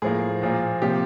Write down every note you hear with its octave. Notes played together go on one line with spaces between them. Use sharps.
A2 F3 A#3 G#4
A#2 F3 A#3
C3 F3 A#3 G4